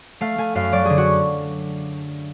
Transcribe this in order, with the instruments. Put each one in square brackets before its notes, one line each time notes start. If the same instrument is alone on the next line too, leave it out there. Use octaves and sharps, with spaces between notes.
[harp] A3 F5
A3 G#5
F#2 F5
F#3 D5
D3 G#4
F#4